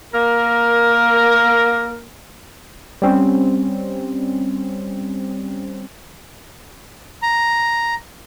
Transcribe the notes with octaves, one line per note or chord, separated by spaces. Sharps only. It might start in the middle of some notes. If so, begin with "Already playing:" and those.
A#3 A#4
G3 C4 C#4
A#5